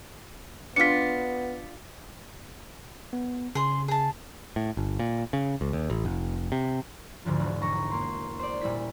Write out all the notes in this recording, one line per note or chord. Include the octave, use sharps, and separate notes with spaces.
B3 D4 F4 B6 C#7
B3
C#3 G#4 C6
G#4 A5
A2
G1
A#2
C#3
C#2
D#2
A1
F1
C3
D2 G#2 D3 F3
E1
B1 A#5 C#6
A#3 C6
C5 D5
A#2 G3 E4 B6